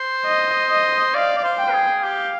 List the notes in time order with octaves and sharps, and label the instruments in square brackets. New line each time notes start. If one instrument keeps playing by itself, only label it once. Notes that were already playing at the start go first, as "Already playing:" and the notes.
Already playing: [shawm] C5
[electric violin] D#5
D#5
[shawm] D5 [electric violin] F5
[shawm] D5
C5
[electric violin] G5
[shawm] G#4
[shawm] G4 [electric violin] F5